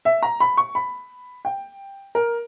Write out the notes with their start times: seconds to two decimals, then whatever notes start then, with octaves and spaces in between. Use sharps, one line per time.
0.05 E5
0.23 A#5
0.40 B5
0.57 C#6
0.75 B5
1.45 G5
2.15 A#4